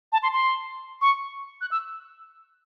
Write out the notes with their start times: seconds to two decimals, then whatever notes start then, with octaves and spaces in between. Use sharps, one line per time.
0.12 A5
0.23 C6
0.33 C6
1.01 C#6
1.61 F#6
1.71 E6